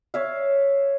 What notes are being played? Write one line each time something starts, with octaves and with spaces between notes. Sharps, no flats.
C#5 E5 F5